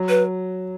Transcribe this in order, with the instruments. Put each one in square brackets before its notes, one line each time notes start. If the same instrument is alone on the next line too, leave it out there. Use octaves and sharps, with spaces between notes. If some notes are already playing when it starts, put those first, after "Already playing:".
Already playing: [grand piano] F#3
[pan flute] B4